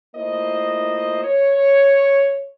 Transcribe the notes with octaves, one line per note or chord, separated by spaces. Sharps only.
A3 A#3 E4 F4 C5 D#5
C#5